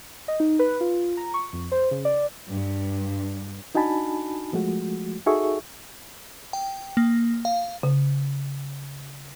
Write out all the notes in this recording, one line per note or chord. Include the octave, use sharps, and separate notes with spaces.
D#5
D#4
B4
F4
A#5
C#6
F2
C5
C#3
D5
G2
D4 D#4 F#4 G#5 A5 B5
F3 G#3 A3 F#4
D#4 F#4 G#4 A4 E5 C#6
G5
A#3
F5
C#3